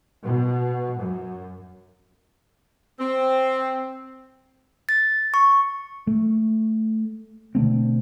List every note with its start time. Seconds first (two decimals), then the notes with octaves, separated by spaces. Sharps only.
0.24 B2
0.99 F#2
3.00 C4
4.89 A6
5.34 C#6
6.07 A3
7.55 B2 D3 A3 C4